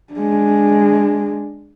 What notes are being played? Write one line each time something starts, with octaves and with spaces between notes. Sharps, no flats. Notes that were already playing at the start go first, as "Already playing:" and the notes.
G#3 D4